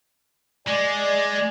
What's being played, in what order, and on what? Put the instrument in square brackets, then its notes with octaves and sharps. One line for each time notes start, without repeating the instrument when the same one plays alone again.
[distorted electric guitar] G#3 [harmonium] D5 G#5